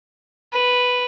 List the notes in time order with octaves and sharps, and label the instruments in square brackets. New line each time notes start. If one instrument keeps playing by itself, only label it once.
[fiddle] B4